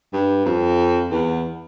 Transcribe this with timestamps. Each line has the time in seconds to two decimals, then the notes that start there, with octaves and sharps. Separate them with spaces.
0.13 G2
0.45 F2
1.11 E2